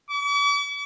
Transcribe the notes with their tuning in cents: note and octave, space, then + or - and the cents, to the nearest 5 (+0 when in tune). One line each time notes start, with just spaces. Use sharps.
D6 -45